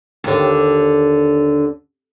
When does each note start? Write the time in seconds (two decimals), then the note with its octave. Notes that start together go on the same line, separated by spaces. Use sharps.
0.24 D#2 D3